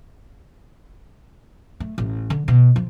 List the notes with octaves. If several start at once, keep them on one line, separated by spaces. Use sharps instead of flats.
A3
A1
D3
B2
F3